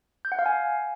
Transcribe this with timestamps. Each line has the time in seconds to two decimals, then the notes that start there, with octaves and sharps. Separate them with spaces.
0.25 G6
0.32 F#5
0.39 F5
0.46 G#5